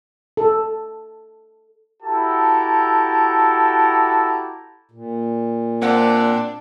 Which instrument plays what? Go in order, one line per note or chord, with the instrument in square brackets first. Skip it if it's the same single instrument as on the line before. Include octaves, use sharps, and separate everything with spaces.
[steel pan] A4
[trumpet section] E4 F#4 G4 A4 A5 A#5
[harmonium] A#2
[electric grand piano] A#3 C4 F#5 [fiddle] D4